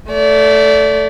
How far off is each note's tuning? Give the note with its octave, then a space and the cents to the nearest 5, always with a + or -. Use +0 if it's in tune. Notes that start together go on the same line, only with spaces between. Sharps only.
A3 +0 D5 -30